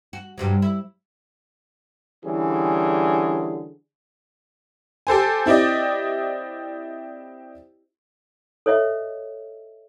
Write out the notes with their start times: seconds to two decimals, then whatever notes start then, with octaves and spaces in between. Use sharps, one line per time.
0.13 F#4
0.38 G2 C3 F#3
0.62 E4
2.25 D3 E3 G3 C#4 G#4
5.07 G4 A4 C5 G#5
5.46 C4 E4 G4 D5 D#5
8.66 A4 C#5 D#5 E5